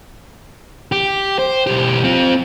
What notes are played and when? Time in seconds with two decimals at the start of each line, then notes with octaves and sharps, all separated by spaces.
0.92 G4
1.39 C5
1.67 B1 G4
2.04 C4 F4